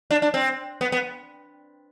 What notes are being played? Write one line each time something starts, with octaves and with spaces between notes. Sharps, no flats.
D4
D4
C4
B3
B3